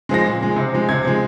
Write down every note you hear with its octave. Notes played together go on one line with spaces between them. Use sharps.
F3 G#3 A#6
A#2
F3 G#3
C3
F3 G#3
C3 G#6
F3 G#3